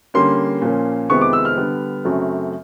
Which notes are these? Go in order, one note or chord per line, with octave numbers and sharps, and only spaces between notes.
D3 G3 A#3 C#4 C6
A#2 F3 A#3 C#4
F2 C3 D#3 G#3 B3 C#6
D6
E6
F6
D3 G3 B3
F#2 C#3 F#3 A3 C4